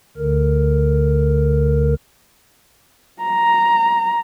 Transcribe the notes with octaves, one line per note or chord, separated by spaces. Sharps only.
D2 D3 A#4
A#5